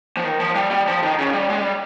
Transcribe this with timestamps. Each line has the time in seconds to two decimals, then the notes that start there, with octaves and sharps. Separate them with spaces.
0.17 F3
0.24 D#3
0.40 F3
0.55 G3
0.71 G3
0.88 F3
1.03 D#3
1.19 C#3
1.34 G3
1.50 G#3
1.61 G3